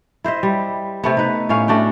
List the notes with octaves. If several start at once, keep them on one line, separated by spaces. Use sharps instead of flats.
E4 C5 D#5 E5
G3
C3 A3 B3
D#4 B4
A2 B3 C#4 F5
A3 D4 F#4 G5